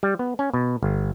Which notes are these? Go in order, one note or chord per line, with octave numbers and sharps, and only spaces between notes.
G3
B3
C#4
B2
G1